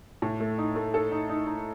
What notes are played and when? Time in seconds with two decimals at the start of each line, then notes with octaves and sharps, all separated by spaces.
0.22 A2
0.40 A3
0.58 D#4
0.75 A3
0.94 A4
1.12 D#4
1.29 D#4
1.47 D#4